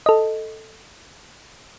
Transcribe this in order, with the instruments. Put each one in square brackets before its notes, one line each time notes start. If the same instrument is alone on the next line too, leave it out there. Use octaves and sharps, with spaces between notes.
[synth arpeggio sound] A4 D#5